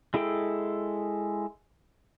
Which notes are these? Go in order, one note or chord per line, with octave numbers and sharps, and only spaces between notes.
G#3 E4 G#4 A4 G5